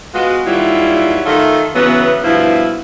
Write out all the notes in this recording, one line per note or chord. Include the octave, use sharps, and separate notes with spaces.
G#3 B3 F4 F#4
D#2 F#3 G3 E4 F4
D#3 A3 F4 A4
C#3 E3 F#3 B3
G2 B2 F3 E4